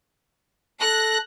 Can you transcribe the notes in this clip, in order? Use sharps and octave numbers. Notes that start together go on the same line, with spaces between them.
A4 F#6 A#6